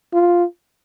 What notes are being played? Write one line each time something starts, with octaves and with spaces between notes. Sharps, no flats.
F4